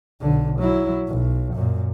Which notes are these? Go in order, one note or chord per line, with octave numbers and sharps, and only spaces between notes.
B1 D3
F#3 E4
B1
F#2 A#2